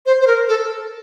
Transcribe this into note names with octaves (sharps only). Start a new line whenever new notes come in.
C5
C5
A#4
A4